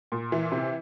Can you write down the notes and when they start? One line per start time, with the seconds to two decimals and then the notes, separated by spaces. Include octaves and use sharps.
0.12 A#2
0.32 E3
0.52 C3